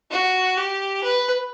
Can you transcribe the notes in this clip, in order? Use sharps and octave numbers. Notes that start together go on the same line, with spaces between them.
F#4
G4
B4